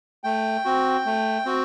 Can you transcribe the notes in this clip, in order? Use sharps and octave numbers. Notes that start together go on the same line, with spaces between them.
A3 G5
C4 F#4
A3
C4 F#4